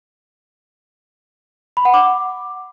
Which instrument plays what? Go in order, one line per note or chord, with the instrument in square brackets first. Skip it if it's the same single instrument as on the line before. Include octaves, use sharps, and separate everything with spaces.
[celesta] B5
F#5
D6